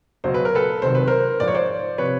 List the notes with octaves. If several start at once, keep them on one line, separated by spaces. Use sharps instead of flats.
C#2 B2 F#3 C5
B4
A#4
A4 B4
C2 C3 D#3 F#3 C5
B4
A#4 C5
G#2 F3 D5
C#5
C5 D5
C3 F3 B4 C#5